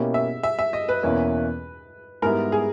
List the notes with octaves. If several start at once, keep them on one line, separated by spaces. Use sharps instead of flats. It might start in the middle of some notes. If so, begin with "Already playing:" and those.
Already playing: B2 A#3 C#4 E4 G4
E5
E5
E5
D#5
B4
E2 B2 A#3 C#4 E4
G#2 G3 B3 E4 A#4
G#4